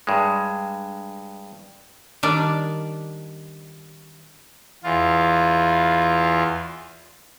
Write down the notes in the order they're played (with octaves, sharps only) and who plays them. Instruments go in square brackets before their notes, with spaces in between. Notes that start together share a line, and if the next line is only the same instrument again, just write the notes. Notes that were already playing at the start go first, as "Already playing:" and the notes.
[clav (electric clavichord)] G2 G#3
[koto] D#3 G3 D4 D5
[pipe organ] E2 F4